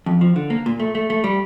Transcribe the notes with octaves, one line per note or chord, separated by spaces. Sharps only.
F2
F3
D3
A#3
A#2
A3
A3
A3
G3